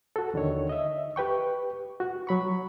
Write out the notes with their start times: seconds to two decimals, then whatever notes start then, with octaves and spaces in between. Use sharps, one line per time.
0.16 F#4 A4
0.34 D#2 D3 D#3 C#5
0.69 D#5 E5
1.16 G4 B4 G5 C#6
2.00 F#4
2.27 F#3 B5 C#6